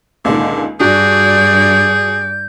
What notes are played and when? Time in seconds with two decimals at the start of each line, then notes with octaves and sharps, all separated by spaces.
0.25 C#2 A#2 D3 D#3
0.80 G2 D4 F#4 G#4 D5 G6